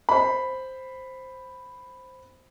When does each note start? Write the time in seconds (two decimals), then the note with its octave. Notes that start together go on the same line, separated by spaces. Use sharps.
0.09 C5 B5